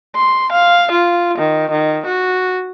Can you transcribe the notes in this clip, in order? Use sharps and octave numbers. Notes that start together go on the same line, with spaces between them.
C6
F5
F4
D#3
D#3
F#4